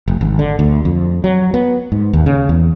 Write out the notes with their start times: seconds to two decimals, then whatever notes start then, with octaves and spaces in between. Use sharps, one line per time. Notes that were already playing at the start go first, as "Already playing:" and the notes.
0.08 F1
0.21 G#1
0.39 D3
0.59 D2
0.85 F2
1.24 F#3
1.54 B3
1.92 G#2
2.13 D#2
2.26 C#3
2.49 E2